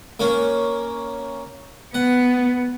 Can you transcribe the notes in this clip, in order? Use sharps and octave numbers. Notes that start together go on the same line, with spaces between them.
A#3 C#4
B3 F#5